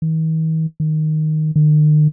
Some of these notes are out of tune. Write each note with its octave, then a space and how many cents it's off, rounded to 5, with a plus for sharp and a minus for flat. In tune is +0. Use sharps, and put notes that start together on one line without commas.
D#3 +45
D#3 -5
D#3 -45